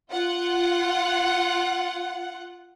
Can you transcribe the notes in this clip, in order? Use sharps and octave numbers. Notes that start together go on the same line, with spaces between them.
F4 F#5